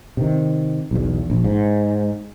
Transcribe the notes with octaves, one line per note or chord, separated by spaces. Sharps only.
C3 D#3
B1 E2
A#1
G#2